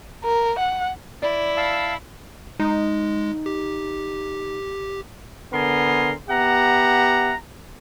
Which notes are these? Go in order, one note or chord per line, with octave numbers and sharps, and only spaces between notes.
A#4
F#5
E4 D5
F5 A5 E6
G#3 D#4
G4
D3 B3 A#4 G#5 C6
B3 G4 E5 F#5 A#5